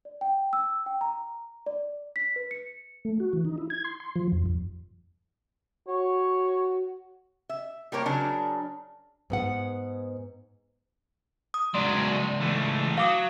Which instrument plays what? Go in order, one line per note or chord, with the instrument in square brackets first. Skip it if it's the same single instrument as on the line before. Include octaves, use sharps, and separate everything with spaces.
[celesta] D5
G5
E6
G5
A#5
D5
B6
B4
C#7
[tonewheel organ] A3
F#4
E3
D#4
E4
G#6
C6
C6
F3
F2
F2
[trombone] F#4 [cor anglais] C#5
[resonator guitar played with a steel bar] E5
G3 A#3 A#4 C#5
C#3 F#3 D4 A#4
[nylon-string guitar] G#2 B3 F#5
[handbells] D#6
[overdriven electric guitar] C#2 D5 [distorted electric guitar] G#2 F#3 [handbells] C6
[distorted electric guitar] E3 A3
[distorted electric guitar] F#3 [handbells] F5 D6 D#6